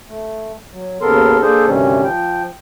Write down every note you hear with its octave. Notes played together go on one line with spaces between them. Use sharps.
A3
F#3
D#2 C#3 B3 A4 A#4 C6
A#3 D4 G#4 A4 C5
D2 G2 C3 D#3 G3 C#4
F3 G5